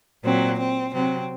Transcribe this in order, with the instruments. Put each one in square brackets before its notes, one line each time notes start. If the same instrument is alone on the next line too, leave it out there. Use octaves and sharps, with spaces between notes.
[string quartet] A#2 F#3 C4
C4
C3 F#3 C4